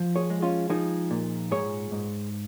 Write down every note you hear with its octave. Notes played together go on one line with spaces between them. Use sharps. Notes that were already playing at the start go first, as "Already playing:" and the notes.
Already playing: F3
G#4 C#5
G#3
C#4 F4
F3 D#4 G#4
A#2
G#2 G#4 C#5
G#2